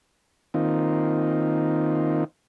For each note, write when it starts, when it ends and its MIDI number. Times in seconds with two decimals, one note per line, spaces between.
0.54 2.24 51
0.54 2.24 58
0.54 2.24 60
0.54 2.24 63
0.54 2.24 65